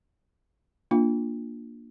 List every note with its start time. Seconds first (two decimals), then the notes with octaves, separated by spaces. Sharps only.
0.91 A#3 D4 F4